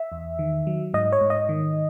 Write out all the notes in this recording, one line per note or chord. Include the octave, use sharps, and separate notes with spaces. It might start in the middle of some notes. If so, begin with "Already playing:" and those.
Already playing: E5
E2
D#3
F#3
G#2 D#5
C#5
G#2
D#5
D#3